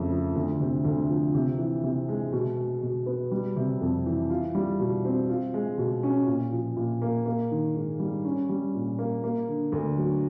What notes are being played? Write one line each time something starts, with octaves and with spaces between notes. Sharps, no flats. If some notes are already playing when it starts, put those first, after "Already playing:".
Already playing: F2 C#3 A3
F3
D2
C3
D2
F3
C3
E3
C3
G#3
B2
G#3
B2
B3
G3
C3
F2
E3
F4
G3
B2
C4
F4
G#3
B2
C#4
A#2
F3
A#2
A#3
A#3
D#3
G#2
G3
C#4
G3
A#2
A#3
A#3
D3
D2
F#3